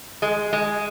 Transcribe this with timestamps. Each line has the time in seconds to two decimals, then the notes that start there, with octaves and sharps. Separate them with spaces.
0.22 G#3
0.53 G#3